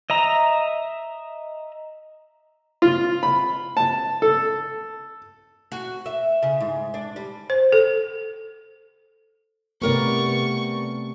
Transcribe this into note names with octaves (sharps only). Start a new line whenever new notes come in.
D#5 E5 A#5
F4
B5
A5
A4
F#4
E5
C#3
G#2
D4
G3
C5
A4
C3 A3 B3 G4 A#4 D5 C#6